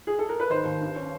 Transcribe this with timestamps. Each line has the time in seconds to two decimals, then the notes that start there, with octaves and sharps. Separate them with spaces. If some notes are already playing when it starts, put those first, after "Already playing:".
0.07 G#4
0.19 A4
0.29 A#4
0.40 B4
0.50 D#3 C5
0.65 D#2
0.81 G2
0.96 C#4